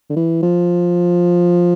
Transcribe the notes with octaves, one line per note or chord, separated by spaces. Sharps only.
D3
E3
F3